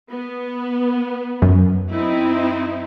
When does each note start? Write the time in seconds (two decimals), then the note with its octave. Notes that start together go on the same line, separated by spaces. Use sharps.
0.10 B3
1.42 F#2
1.91 C4 D#4 E4